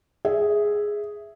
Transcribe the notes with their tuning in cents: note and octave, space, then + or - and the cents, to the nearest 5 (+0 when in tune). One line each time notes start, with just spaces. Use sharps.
G#4 +0 E5 +0